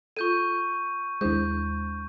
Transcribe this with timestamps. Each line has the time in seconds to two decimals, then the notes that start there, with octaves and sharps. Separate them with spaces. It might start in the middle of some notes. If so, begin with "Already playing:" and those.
0.17 F4 A4 C#6 G6 D#7
1.21 D#2 G#3 D4 E4 C5 G6